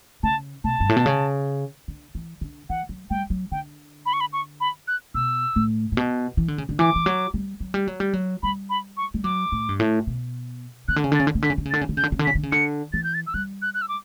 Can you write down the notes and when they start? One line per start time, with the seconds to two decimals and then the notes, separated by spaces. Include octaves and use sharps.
0.23 C#3 A5
0.64 B2 A5
0.80 G2
0.89 A2
0.97 B2
1.06 C#3
1.88 D3
2.15 E3
2.41 D3
2.70 E3 F#5
2.89 F#3
3.10 G3 G5
3.30 F#3
3.52 D3 G5
4.06 B5
4.13 C#6
4.21 B5
4.33 C#6
4.60 B5
4.88 F#6
5.14 B2 E6
5.56 A2
5.92 A2
5.97 B2
6.37 E3
6.48 D3
6.58 C#3
6.69 D3
6.79 E3 D6
6.96 E3
7.06 F#3
7.34 G3
7.60 F#3
7.74 G3
7.88 F#3
8.00 G3
8.13 F#3
8.43 G3 B5
8.70 B5
8.97 C#6
9.14 G3
9.24 F#3 D6
9.52 A2
9.69 G2
9.80 A2
10.07 B2
10.88 C#3 F#6
10.96 D3
11.04 C#3
11.12 D3
11.15 A6
11.20 C#3
11.27 D3
11.35 C#3
11.42 D3 B6
11.50 C#3
11.58 D3
11.65 C#3
11.71 D3 A6
11.81 C#3
11.89 D3
11.97 C#3 G6
12.03 D3
12.12 C#3
12.19 D3
12.25 C#3 B6
12.35 D3
12.43 C#3
12.52 D3 C#7
12.93 E3 A6
13.04 G6
13.14 A6
13.27 E6
13.34 G3 F#6
13.62 F#6
13.74 F#6
13.82 E6
13.89 D6